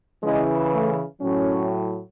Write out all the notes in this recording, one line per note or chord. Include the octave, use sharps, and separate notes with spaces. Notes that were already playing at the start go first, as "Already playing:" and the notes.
C#3 E3 G#3
A3
A2 F#3 C#4